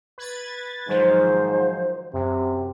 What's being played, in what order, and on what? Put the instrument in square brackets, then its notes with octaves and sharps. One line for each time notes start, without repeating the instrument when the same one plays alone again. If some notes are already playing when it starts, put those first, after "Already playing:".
[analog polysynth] B4 G#6 A6
[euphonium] G#2 [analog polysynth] D#3 F3 F#3 [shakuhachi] C5
[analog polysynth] F#2 [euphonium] C3